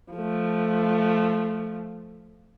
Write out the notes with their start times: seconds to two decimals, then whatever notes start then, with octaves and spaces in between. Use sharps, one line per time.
0.13 F3 A3